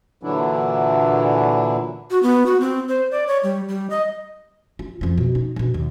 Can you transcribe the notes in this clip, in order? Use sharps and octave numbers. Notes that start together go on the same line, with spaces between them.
A#2 D3 E3 F#3 D4 E4
F#4
B3
F#4
C4
C5
D5
C#5
G3
G3
D#5
F4
F2 F3
B2
D#4
G2 B2
D#2